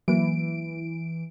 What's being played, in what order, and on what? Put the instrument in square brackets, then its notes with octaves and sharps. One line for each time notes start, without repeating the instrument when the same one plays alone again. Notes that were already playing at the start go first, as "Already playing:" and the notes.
[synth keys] E3 D7 [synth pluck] F#3 A#3